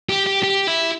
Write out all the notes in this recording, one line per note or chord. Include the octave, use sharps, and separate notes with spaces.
G4
G4
G4
E4